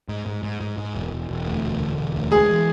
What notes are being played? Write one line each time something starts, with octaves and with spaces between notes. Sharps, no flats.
G#2
G#2
G#2
G#2
G#2
E1
E1
E1
D2
E1
D3
E1
D2
G#3 G#4
E3